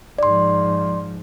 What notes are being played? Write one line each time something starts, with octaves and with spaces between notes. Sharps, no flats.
G#2 F3 D5 C6